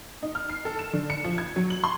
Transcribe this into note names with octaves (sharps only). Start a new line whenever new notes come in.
D#4
F6
C7
A4
E7
D3
C#7
F3
G#6
F#3
F#7
C6